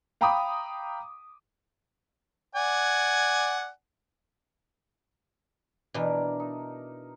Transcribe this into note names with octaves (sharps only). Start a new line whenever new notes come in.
F5 G5 A#5 B5 D6 D#6
D5 F#5 G#5
B2 E3 D4 A#4
D#4